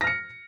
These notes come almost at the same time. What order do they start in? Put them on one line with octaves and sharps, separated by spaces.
A#6 F6 C#7